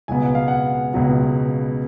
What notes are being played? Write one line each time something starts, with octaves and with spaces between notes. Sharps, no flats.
C#2 B2 F#3 B3 G#5
F#5
F5
F#5
C#2 B2 F#3 B3